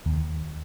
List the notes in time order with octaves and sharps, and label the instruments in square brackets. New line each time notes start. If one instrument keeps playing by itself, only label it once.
[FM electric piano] D#2